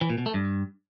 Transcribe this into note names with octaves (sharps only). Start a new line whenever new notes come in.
E3
A#2
B2
A3
G2